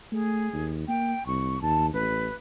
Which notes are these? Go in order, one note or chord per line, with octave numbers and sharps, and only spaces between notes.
A3 G#4
D#2
A#3 G5
C2 C#6
D#2 A5
A1 B4